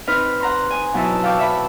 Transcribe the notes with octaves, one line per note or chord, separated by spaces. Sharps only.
C4 D#4 B4 F6
F#5 A#5 C6
G#5 D#6
B2 F#3 D#4 E4 A5 E6
F5 G5 A5 C#6 D6 E6
E5 B5